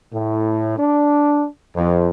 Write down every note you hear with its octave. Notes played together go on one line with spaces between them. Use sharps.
A2
D4
F2